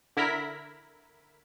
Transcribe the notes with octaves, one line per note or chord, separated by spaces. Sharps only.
D3 E4 A#4 B6